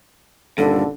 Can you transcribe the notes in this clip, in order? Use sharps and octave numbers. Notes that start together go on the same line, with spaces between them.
D#1 G2 D3 A4